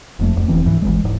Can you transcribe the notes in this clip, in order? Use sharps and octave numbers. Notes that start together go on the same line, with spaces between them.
F1 F2 A3
D1 F2
E1 D2 E3 C4
D2 G#2 E3
G1 E2 E3 G#3
D1 G#2